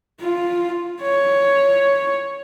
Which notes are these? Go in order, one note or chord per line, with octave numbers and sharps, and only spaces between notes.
F4
C#5